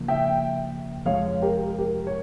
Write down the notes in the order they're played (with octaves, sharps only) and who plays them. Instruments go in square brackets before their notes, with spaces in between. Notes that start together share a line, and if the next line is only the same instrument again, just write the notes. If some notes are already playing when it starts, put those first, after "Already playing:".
Already playing: [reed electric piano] C#3 F3 A#3
[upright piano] E5 G5
[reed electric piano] F2 C3 F3 G#3 [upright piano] C#5 F5
[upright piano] G4 A#4
G4 A#4
C#5